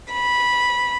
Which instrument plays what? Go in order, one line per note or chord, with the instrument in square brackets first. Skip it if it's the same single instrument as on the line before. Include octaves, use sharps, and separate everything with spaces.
[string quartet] B5